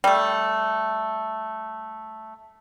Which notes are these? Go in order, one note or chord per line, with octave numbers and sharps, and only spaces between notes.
G3 A3